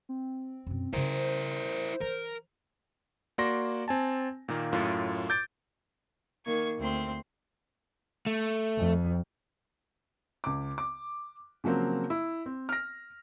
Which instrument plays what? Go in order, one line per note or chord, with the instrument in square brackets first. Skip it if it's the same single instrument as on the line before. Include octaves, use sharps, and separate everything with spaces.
[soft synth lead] C4
[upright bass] F#2 B2
[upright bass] C#3 F4 [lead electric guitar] E4 A#4 [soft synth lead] C5
[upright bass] E3 [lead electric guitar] A#4
[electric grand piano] A#3 F#4 D5 C6 A#6
C4 G#5 A5
A#2 D#3 A#3
F#2 A2 F4
D6 G6 A6 D7
[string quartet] D#3 A#3 C#6 G#6
D2 C4 C6
[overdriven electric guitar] A3
[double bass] F2
[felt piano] C#2 D6
D6
C#3 F3 F#3 A#3 C4
E4
C4
F6 A#6